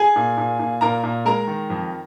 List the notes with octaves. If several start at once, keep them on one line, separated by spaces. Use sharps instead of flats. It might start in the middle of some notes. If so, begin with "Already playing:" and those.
Already playing: G#4 G#5
A#2
A#2
A#2
A#2 A#4 A#5
A#2
G#3 A#4 A#5
D#3
F2